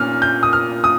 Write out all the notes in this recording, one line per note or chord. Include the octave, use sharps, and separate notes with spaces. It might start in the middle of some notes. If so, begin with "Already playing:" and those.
Already playing: A#2 C#4 F6
G6
D#6
F6
D#6